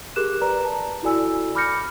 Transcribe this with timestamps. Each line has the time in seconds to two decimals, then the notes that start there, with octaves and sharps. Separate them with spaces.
0.16 G4 G#4 A#4 D6 F#6 E7
0.41 B4 D5 A#5
0.65 A5 A#5
1.03 E4 F#4 A4 D5 G#5 E6
1.55 B5 D6 F6 G6 A#6 C#7